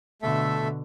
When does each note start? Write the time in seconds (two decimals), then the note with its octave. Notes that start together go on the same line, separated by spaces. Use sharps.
0.22 B2 D3 A3 A4 E5